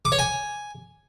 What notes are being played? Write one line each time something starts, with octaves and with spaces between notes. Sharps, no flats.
D6
C#5
G#5